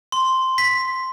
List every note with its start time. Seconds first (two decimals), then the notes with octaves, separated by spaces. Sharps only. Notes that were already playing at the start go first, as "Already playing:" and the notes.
0.12 C6
0.58 B6